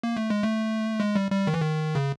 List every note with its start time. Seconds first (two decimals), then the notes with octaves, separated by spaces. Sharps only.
0.03 A#3
0.17 A3
0.30 G#3
0.43 A3
1.00 G#3
1.15 G3
1.31 G3
1.47 D#3
1.54 E3
1.62 D#3
1.95 C#3